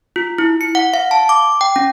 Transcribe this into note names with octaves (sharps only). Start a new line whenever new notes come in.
F4
E4
C#7
F#5
F5
A5
D6
G5
C#4